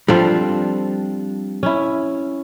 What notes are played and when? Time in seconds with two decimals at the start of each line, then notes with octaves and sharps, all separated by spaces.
0.08 F3 G3 C4 D4 F4 A4
1.63 C#4 E4